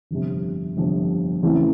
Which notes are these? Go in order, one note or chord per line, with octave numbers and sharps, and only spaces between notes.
G1 F2 C3
G1 F2 C3
E2 C#3 E3 A3 C4